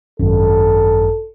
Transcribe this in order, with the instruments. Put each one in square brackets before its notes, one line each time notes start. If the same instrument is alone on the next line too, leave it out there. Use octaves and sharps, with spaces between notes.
[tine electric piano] G#1 F#2 [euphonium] A4